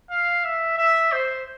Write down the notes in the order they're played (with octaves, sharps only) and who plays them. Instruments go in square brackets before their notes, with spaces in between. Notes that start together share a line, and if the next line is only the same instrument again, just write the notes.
[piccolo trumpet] F5
E5
E5
C5